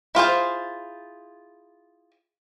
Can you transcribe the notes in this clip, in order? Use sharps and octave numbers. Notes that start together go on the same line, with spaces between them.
E4 F4 G#4 C5